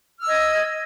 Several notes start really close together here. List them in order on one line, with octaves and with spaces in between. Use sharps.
F6 E6 D#5 G#6